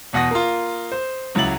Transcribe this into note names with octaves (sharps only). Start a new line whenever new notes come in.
E2 B2 F#5 D#6 A#6
A#3 F4
C5
C#2 F#3 E4 A6 F#7